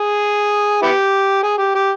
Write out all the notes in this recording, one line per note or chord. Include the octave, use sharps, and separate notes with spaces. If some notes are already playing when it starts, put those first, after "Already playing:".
Already playing: G#4
B3 E4 G4
G#4
G4
G4